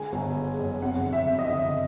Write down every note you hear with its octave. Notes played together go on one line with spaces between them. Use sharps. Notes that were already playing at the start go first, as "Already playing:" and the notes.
Already playing: D3 G#3 G#5
G1
G#3
F#2
F2 F#5
D3
E5
F2
D#5
E5
D3